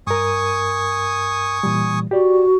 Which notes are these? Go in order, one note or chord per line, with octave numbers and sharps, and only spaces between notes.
G2 A#4 G#5 C#6 D#6
A#2 E3 G3
F#4 G4 D5